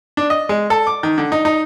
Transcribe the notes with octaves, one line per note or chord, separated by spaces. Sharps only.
D4
D#5
G#3
A4
D6
D#3
D3
D#4
D#4